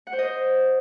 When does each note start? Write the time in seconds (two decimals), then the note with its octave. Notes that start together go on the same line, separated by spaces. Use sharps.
0.07 F#5
0.13 C5
0.19 D#5
0.24 C5